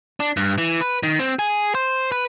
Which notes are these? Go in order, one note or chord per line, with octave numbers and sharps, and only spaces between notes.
D4
G2
E3
B4
D#3
C4
G#4
C5
B4